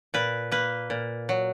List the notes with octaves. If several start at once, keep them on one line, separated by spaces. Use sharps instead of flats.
A#2 B4
A#3 B4
A#2
F#3